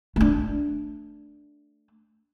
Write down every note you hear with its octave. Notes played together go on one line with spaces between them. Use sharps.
A3 D4